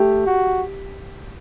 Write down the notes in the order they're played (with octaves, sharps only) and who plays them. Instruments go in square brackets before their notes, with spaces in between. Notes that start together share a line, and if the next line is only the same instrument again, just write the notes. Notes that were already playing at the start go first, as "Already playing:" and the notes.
Already playing: [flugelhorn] A3 [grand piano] G4
[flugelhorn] F#4